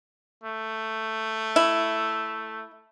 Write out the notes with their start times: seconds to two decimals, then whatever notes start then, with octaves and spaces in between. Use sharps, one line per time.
0.44 A3
1.56 E4